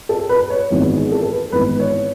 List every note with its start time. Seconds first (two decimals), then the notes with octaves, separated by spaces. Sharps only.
0.09 A4
0.29 B4
0.50 C#5
0.70 G#1 G#2 E3 B3 D#4
0.91 G#4
1.12 A4
1.22 A4
1.32 B4
1.52 G#1 G#2 E3 B3 D#4 B4
1.80 C#5